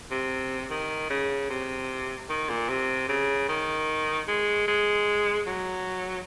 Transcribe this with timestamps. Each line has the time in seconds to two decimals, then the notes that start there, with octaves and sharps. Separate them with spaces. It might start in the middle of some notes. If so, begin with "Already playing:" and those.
0.11 C3
0.71 D#3
1.10 C#3
1.50 C3
2.29 D#3
2.49 A#2
2.69 C3
3.09 C#3
3.49 D#3
4.28 G#3
4.68 G#3
5.47 F#3